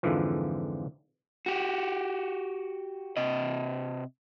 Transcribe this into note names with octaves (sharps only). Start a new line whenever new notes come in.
F2 G#2 D3 E3 F3
F#4 G4
C3 D#5